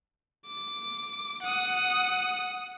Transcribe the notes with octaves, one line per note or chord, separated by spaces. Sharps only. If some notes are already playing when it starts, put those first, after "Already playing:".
D6
F#5 D#6